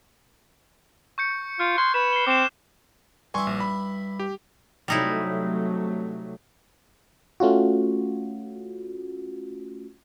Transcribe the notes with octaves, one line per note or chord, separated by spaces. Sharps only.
C#6 G6 C#7
F4 F6
C6 F#6 G#6
B4 E7
C7 G7
C4 D6 E7
G2 E4 G#5 C6 C#6
A#1
B5
G4
C3 F#3 G3 A3 D#4 E4
A3 C#4 F4 F#4